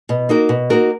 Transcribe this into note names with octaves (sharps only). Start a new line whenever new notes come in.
B2
A#3 D#4 F#4 A#4
B2
A#3 D#4 F#4 A#4